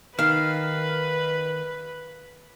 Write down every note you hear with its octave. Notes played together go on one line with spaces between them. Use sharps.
D#3 B4 F5